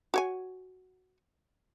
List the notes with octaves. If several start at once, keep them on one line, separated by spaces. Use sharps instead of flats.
F#4 C#5 G#5